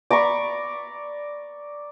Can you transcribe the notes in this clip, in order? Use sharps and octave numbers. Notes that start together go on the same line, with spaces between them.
D5 A#5 B5 C#6